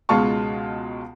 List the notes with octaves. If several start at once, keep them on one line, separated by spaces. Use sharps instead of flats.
C#2 B2 G#3 F4 A5 C#6